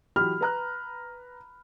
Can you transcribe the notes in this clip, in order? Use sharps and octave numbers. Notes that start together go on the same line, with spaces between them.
E3 F#3 G4 B5 F6
B4 A#5 F#6